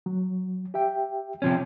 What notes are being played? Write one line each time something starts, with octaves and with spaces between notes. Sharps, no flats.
F#3
G4 E5 G5
C3 F3 C#4